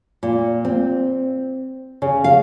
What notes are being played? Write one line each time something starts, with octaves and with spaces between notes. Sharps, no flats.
A#2
C4
C#3
F5